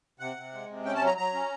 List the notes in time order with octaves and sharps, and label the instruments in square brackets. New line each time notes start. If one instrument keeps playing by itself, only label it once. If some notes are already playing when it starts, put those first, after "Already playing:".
[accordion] C3 F#5
C3
G#3
C3
C#4 G5
A5
F#3
A#5
F#3 A#5
C#4